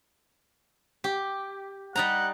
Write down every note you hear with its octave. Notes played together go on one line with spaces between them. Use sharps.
G4
G3 D#4 F#5 A#5